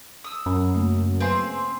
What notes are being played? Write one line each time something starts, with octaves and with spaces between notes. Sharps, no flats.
D#6 E6
F#2 B5
C#3 A3 A#3
C4 G#4 B4 F5 G#5 C6